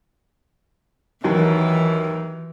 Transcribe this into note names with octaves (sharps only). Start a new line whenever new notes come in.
D#2 E3 F#3